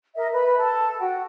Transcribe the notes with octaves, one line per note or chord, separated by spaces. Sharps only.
A#4 D#5 E5
B4 B5
A4 A5
F#4 F#5 G5